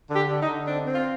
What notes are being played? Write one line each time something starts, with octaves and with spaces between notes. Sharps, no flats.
D3
G4
D3
D#4
D3
C4 D4
C4
F4